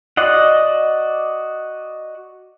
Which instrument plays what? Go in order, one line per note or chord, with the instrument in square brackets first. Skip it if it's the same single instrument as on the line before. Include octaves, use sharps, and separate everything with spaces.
[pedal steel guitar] F#4 D5 D#5 F#5